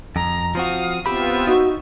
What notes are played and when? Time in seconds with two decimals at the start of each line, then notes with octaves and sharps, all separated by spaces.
0.16 F2 A#5
0.55 F3 C4 F#4 F5 D#6
1.06 B3 C4 F4 G4 E5 B5
1.47 D#4 F#4